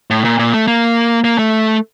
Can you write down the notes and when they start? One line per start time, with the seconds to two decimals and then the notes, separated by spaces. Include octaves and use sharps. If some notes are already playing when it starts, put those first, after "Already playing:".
0.10 A2
0.25 A#2
0.39 A#2
0.54 A3
0.68 A#3
1.24 A#3
1.38 A3